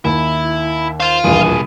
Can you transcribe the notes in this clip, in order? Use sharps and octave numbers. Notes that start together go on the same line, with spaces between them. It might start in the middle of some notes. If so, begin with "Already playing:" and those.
D#2 E4
C5 F5 C6
D#1 A#1 E2 B2 G#4